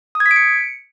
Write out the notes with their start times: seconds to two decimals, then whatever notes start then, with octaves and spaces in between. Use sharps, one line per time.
0.15 D#6
0.20 G#6
0.26 B6
0.31 D7
0.36 C#7